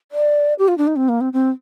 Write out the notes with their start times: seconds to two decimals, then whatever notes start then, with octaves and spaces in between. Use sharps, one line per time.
0.12 D5
0.59 G4
0.68 F4
0.78 D4
0.87 D#4
0.96 C4
1.09 A#3
1.21 C4
1.33 C4